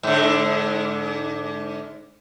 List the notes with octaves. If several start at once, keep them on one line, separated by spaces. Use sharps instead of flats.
G#2 D3